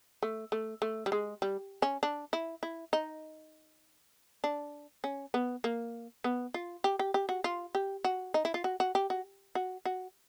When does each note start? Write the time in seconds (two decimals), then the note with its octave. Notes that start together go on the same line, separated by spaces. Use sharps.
0.23 A3
0.52 A3
0.82 A3
1.06 G3
1.12 G#3
1.42 G3
1.82 C#4
2.03 D4
2.33 E4
2.63 E4
2.93 D#4
4.44 D4
5.04 C#4
5.34 B3
5.64 A#3
6.24 B3
6.54 F4
6.84 G4
6.99 G4
7.14 G4
7.29 F#4
7.44 F4
7.75 G4
8.04 F#4
8.34 D#4
8.45 E4
8.54 F4
8.64 F#4
8.80 F#4
8.95 G4
9.10 F#4
9.55 F#4
9.85 F#4